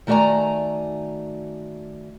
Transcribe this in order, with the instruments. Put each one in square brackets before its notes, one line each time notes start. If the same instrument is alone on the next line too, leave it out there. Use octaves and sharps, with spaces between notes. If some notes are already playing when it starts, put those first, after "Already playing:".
[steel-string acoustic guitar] D#3 A3 F#4 D5 G#5 A#5